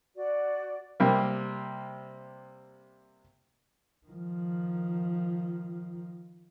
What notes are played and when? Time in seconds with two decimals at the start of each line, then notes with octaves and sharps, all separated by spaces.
0.16 F#4 D5
1.00 C3 G3 A#3
4.07 D#3 F3